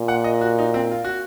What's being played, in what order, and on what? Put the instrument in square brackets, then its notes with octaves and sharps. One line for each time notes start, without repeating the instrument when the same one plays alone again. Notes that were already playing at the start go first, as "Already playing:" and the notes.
Already playing: [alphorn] A#2
[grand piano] F#5
D#5
F#4
D#4
C4
F4
F#4